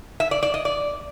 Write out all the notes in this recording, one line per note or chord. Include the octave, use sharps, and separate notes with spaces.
E5
D5
D5
D#5
D5